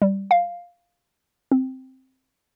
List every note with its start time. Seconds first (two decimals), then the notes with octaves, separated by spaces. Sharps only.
0.02 G3
0.31 F5
1.51 C4